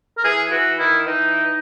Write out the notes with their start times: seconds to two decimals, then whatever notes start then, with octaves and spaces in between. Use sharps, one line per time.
0.18 A#4
0.24 E3 G#4
0.51 E3 F#4
0.78 D#3 E4
1.06 E3 D#4